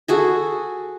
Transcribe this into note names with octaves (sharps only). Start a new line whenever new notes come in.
F#4 G#4 A4